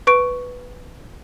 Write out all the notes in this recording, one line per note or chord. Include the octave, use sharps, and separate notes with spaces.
B4 C#6 D7